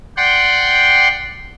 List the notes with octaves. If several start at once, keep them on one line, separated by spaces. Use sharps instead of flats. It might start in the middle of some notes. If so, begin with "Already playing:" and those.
D5 F#5 G5 C6